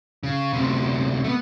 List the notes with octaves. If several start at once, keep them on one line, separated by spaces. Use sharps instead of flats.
C#3
D2 C3
A3 B3